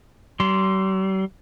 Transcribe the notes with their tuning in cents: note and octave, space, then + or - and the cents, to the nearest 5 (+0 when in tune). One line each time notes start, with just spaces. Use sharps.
G3 -45 C6 +0